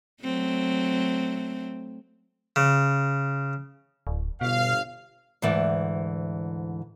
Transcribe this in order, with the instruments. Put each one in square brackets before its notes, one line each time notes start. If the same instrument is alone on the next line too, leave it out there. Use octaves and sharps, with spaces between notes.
[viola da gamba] F#3 A3 C4
[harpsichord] C#3
[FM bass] D1
[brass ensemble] G1 F5 [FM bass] B2
[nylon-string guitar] D2 G#2 E3 D5